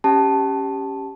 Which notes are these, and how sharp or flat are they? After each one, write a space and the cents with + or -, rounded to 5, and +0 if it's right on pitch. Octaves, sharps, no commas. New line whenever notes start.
C#4 +0 G4 +0 A5 +0